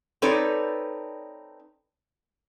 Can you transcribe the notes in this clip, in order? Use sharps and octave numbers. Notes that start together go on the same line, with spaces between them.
C4 D#4 A4 B4 C#5 D5